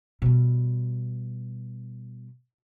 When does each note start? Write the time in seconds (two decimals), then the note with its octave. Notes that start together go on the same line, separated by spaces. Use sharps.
0.22 B2 G3